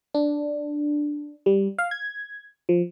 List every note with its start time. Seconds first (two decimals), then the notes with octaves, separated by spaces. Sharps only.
0.14 D4
1.46 G3
1.78 F5
1.91 G#6
2.69 F3